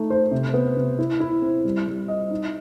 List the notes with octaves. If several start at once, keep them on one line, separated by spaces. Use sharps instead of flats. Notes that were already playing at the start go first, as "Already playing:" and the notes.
Already playing: A3 D#4
C5
C3
B3
C3
E4
E4
C4
G3
G3
D#5
D#4